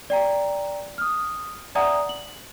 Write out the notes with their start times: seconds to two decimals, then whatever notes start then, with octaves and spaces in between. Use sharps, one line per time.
0.10 D5 G5 A#5
0.98 D#6 F6
1.75 D5 E5 F#5 G#5 A#5 D#6
2.09 F#7